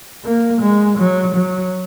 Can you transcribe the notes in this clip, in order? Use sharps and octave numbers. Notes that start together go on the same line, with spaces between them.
A#3
G#3
F#3
F#3